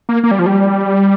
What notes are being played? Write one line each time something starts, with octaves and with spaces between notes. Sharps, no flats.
A#3
A#3
G3
F3
G3